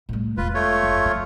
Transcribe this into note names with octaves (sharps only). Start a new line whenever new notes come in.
A2 G3
E1 F4 B4
A3 F4 C#5
F#2
F3